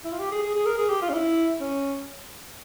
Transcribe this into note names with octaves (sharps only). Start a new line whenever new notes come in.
E4
F4
G4
G#4
G#4
G#4
A#4
G#4
G4
F4
C#4
E4
C#4